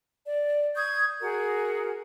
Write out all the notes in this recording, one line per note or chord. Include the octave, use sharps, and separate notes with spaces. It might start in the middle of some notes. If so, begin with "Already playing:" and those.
D5
C#6 D#6 G6 G#6
F#4 G#4 A#4